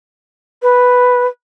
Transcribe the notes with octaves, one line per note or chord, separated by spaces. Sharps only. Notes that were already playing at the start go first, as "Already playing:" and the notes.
B4